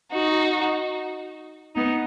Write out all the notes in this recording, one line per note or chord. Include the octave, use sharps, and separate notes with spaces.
D#4 F#4
B3 D#4